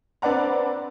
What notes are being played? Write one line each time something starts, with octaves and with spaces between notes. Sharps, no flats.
C4 D4 B4 D5 F#5 A#5